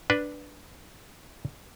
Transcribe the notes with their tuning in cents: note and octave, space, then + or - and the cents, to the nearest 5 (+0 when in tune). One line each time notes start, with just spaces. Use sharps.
D4 +0 B4 +0